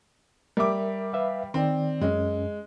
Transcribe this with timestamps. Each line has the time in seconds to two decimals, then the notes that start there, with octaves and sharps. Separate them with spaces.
0.57 G3 A#4 E5 D6
1.13 B4 E5 F5
1.54 D#3 C4 D5
2.01 F#2 G#3 C#4